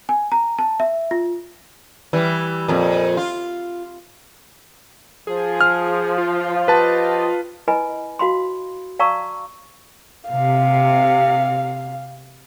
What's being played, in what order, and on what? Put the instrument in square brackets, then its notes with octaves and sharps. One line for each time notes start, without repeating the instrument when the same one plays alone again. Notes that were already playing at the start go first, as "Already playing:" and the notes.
[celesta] G#5
A#5
A5
E5
F4
[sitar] E3 G3
F2 A#2
F4
[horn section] F3 [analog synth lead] G#4
[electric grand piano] F6
[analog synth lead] F4
[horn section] F3 G4 D#5 [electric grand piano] B4 A5
[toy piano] E4 B4 D#5 G#5 B5
F#4 F5 B5 C6
D5 F5 A5 A#5 C#6 E6
[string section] C3 [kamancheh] F5